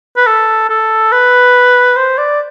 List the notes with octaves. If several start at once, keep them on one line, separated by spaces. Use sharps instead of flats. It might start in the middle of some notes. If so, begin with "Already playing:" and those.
B4
A4
A4
B4
C5
D5